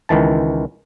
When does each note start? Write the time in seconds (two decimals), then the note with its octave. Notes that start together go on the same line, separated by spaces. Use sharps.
0.09 C#2 D#3 E3 A5